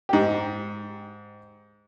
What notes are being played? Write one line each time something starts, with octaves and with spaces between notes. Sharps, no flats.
G#2 G4